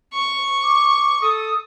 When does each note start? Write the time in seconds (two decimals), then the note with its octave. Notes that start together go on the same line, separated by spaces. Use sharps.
0.13 C#6
0.63 D6
1.22 A4 D#6